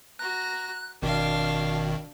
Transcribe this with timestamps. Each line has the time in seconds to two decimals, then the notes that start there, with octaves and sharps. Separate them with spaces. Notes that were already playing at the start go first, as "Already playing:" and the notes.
0.19 F#4 A#5 F#6
1.02 G#1 B2 D#3 D4 F5